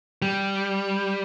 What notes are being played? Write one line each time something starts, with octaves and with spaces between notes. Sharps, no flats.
G3